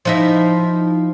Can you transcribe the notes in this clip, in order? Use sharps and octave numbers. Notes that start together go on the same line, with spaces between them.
F3 D#4 E4